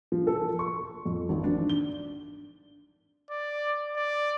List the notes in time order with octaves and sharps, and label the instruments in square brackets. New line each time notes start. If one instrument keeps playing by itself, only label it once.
[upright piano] F3
A4
C#6
F2
G#1
D4
G7
[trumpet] D5
D5